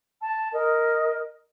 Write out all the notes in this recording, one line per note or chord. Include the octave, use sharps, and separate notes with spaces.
A5
A#4 D#5